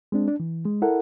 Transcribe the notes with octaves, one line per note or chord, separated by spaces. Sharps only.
G#3 C4 D4
D4
E3
G#3
E4 A4 A#4 F#5